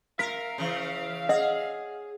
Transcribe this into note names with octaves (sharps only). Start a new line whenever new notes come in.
A#4 E5 F5 B6
C#3 E3
G#4 D#5 F#5